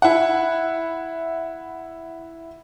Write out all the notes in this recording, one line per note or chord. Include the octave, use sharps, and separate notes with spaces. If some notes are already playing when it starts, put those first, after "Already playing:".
E4 F#5